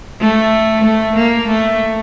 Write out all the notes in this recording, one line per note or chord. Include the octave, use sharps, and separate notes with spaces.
A3
A3
A#3
A3